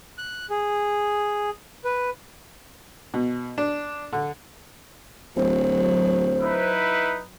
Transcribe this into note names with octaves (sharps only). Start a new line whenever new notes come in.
F#6
G#4
B4
B2
D4
D3
D1 F#3 C5
D#4 E4 B4